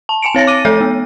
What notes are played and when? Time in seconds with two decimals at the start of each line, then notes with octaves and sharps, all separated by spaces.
0.09 A5
0.22 G#5 A5 C#7 D7
0.35 C4 C#5 A6 A#6
0.47 D6 D#7
0.65 F3 A4 E5 G6
0.81 B3